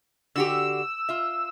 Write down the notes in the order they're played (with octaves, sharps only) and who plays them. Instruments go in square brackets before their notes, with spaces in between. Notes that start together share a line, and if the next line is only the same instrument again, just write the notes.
[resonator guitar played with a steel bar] D3 F#4 G4 [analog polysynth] E6
[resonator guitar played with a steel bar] F4 E5